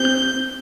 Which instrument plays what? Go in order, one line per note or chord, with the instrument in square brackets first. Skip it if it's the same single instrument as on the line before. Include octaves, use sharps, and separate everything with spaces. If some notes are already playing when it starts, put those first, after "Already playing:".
Already playing: [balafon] C4 G4 C5 [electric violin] G6